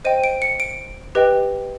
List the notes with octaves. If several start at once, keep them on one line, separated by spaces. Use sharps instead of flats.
C5 D#5 G5 D#7
D7
C#7
D7
G4 B4 D#5 G5